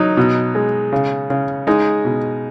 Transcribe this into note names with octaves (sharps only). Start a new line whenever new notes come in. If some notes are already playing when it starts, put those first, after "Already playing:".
Already playing: F#3 D#4
B2
G#3
C#3
C#3
G#3 D#4
B2